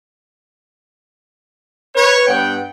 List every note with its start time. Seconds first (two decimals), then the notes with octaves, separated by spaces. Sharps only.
1.96 B4 C#5
2.27 G2 B3 F#5 G5